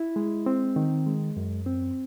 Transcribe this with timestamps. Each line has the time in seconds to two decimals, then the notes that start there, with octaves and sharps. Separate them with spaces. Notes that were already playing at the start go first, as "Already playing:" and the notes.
Already playing: E4
0.16 G#3
0.46 C4
0.76 D#3
1.07 G#3
1.37 F#2
1.66 C4